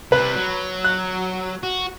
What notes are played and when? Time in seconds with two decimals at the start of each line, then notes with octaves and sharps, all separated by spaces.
0.12 C3 G3 B4
0.35 F#3
0.84 F#6
1.63 F#4